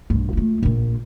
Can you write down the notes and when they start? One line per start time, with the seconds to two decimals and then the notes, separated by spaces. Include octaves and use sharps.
0.10 B1 G2
0.33 A3 F4
0.63 A#1 A#2